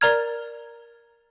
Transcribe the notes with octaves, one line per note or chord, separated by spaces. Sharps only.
A#4 D5 A#5 F6 G#6